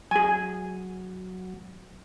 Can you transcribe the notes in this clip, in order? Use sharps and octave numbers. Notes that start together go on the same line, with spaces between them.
F#3 G#4 G#5